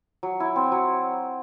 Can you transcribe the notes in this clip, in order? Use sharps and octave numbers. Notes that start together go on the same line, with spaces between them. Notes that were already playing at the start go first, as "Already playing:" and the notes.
F#3
E4
C4
F#3